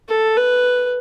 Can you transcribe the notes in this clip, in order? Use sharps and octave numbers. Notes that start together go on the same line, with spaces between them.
A4
B4